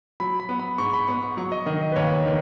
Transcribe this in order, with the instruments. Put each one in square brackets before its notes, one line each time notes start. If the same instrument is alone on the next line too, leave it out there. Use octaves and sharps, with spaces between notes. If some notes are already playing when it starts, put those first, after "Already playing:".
[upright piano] F#3 [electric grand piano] B5
[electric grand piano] B5
[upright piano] B3
[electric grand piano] B5
[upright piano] G#2 [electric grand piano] C#6
[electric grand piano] B5
[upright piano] B3 [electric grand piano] C#6
[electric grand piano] C#6
[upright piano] F#3 [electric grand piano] C#6
[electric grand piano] D#5
[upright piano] D#3 [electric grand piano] D#5
[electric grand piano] D#5
B4
[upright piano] D#2 [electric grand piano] C#5
[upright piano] D#3